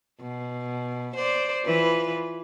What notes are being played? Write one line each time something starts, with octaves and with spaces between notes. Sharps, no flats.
B2
C5 D5
E3 F4 B4